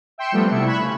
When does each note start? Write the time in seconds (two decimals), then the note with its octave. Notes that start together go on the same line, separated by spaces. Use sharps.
0.18 E5 G5 C6 C#7 E7
0.32 F3 G3 A3 B3 C4
0.50 C3 G3 A3 E4 E5 C#7
0.67 B5 C#6 F#6 G#6 E7
0.81 C#3